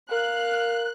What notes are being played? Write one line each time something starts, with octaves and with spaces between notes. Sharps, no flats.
A#4 F5 F#6